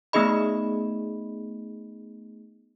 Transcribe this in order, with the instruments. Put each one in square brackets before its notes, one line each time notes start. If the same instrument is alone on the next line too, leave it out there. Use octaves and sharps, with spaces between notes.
[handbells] A3 B3 D#4 G#4 D#5 B5